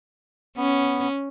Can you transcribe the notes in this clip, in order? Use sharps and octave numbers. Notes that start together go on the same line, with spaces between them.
B3 C#4